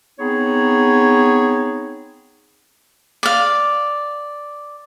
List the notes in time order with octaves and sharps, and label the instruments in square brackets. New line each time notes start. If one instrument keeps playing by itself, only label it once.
[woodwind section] B3 C4 D#4 G#4 C#5
[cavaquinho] D5 F5